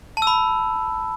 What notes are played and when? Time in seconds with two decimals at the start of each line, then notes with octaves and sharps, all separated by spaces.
0.17 A5
0.22 E6
0.27 B5